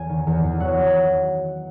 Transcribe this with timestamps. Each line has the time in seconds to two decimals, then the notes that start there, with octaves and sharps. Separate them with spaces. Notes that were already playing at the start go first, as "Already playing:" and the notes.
Already playing: E2 G#5
0.09 D#3
0.27 E2
0.44 E2
0.60 F#3 F#5